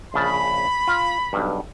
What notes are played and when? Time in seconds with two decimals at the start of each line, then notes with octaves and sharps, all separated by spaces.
0.14 A#1 C#3 A5 B5
0.87 F4
1.33 B1 G2